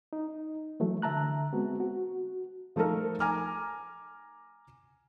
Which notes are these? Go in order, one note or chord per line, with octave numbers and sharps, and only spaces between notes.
D#4
E3 F#3 A3
D3 E5 A5 A#5 F#6
G#3 B3 C4 F#4
F#4
F3 A3 D#4 A4 A#4
G#5 A#5 D6 F6